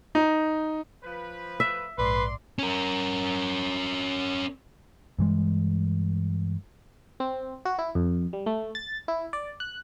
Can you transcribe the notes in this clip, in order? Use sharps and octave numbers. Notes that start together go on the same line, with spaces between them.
D#4
F3 B4
E5
A#1 G#2 B4 D5 C6
C#4 A#4
G2 E3 G#3
C4
F#4
E4
F2
G3
A3
A6
E4
D5
F#6